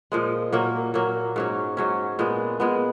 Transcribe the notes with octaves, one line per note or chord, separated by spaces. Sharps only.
A#2 F3 G#3
A#2 F#3 A#3
A#2 F#3 A#3
G#2 F#3 C#4
G#2 F#3 C#4
A#2 G#3 B3
A#2 G#3 B3